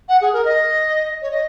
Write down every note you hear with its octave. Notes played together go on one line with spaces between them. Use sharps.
F#5
G#4
A#4
D#5
C#5
D#5